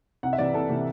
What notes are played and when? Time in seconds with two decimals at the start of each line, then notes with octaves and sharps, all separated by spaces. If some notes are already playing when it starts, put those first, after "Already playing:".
0.23 C2 F#5
0.33 E5
0.38 C3 E3 D5
0.54 C2 A4
0.70 C3 E3